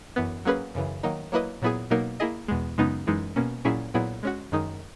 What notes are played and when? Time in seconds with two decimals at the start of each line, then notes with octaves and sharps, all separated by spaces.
0.16 F#2 E3 B3
0.45 F#3 A#3 C#4 G#4 B4
0.75 F#2 C#3 E3
1.03 D#3 F#3 A#3 D#4
1.32 F#3 A#3 E4 B4 D#5
1.62 A#2 F#3 B3 E4 G#4
1.90 B2 F#3 A#3 D#4 A#4
2.20 A#3 E4 G#4 D#5
2.48 E2 B2 G#3
2.78 F#2 C#3 G#3 B3 D#4
3.07 F#2 E3 G#3 D#4
3.36 B2 A#3 C#4
3.65 A#2 F#3 C#4 E4 G#4
3.94 A#2 F#3 B3 E4 G#4
4.23 G#3 C#4 F#4
4.52 F#2 D#3 G#3 D#4